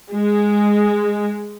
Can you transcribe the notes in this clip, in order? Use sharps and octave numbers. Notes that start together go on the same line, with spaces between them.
G#3